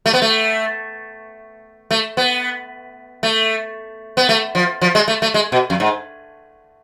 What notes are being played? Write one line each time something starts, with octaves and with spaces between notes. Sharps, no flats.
A3
B3
A3
A3
B3
A3
B3
A3
F3
F3
G#3
A3
A3
G#3
B2
F2
G#2